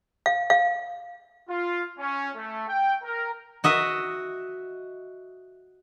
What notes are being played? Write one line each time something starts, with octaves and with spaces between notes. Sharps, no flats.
F5
F5
F4
C#4
A3
G5
A#4
F#4 D#5 E5